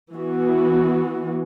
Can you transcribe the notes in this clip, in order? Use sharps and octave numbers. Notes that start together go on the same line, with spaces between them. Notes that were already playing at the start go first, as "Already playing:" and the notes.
E3 B3 F#4